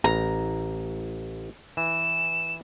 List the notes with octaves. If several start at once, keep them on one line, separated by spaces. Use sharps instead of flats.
A1 A#5
E3 E7